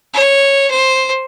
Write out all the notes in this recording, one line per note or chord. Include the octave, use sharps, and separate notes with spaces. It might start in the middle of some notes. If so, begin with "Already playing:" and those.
C#5
C5